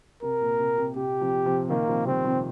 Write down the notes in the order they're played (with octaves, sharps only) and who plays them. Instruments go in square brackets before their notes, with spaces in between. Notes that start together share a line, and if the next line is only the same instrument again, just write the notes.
[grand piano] C3 [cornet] A#4
[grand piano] A#2
C3
C3
[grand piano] C3 [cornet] G4
[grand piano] C3 F3
C3 F3
[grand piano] A#2 D#3 [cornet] A#3
[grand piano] C3 F3
[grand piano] D#3 G3 [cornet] C4
[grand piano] C3 F3